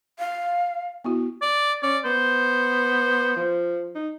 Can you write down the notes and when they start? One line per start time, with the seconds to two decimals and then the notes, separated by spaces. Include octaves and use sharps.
0.19 F5
1.04 B3 E4 F#4
1.42 D5
1.83 C#4 D5
2.05 B3 C5
3.36 F3
3.95 D#4